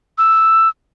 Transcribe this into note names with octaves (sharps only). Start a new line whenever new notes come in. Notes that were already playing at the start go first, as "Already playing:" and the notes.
E6